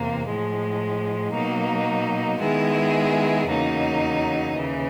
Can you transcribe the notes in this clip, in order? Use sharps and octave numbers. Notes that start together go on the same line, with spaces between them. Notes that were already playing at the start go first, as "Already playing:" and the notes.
Already playing: E2 C3 A#3
A2 F3 G#3
B2 F#3 A#3 D#4
D#3 G#3 B3 E4 G#4
E2 C#3 F#3 A#3 D#4
D#2 C#3 E3